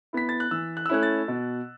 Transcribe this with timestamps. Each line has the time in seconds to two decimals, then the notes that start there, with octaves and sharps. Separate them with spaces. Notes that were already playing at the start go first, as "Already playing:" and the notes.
0.13 B3 E4 B6
0.29 A6
0.40 F#6
0.51 E3 E6
0.77 F#6
0.86 E6
0.90 A3 C#4 E4 F#6
1.03 A6
1.28 B2